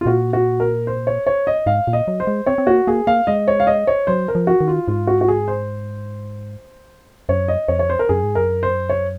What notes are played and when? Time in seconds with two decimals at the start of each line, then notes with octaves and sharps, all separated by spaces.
0.01 F4
0.06 A#2 F#4
0.33 F#4
0.60 A#4
0.87 C5
1.07 C#5
1.27 C#5
1.47 D#5
1.66 G#2 F5
1.87 A#2
1.93 D#5
2.08 F#3
2.20 C5
2.27 G#3
2.46 C4 C#5
2.58 C4
2.67 A#3 F#4
2.87 A#3 G#4
3.07 A#3 F5
3.27 G#3 D#5
3.48 C#5
3.60 F5
3.67 D#5
3.87 C#5
4.07 F#3 C5
4.28 A#4
4.35 F3
4.47 F#4
4.61 D#3
4.68 F4
4.88 G#2 F4
5.07 F#4
5.21 F#4
5.28 G#4
5.48 C5
7.29 F#2 C#5
7.48 D#5
7.68 F2 C#5
7.79 C#5
7.90 C5
7.99 A#4
8.09 F#2 G#4
8.23 G#2
8.35 F#2 A#4
8.63 C5
8.89 C#5